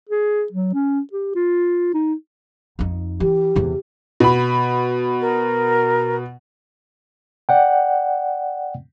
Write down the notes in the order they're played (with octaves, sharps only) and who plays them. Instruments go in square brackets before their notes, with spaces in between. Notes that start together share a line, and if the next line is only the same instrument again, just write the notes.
[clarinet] G#4
F#3
C#4
G4
F4
D#4
[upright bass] F2 D#4
[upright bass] E3 [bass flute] G4
[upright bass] E2 C3
[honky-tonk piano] B2 B5
[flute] A#4
[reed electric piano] D5 F#5 G5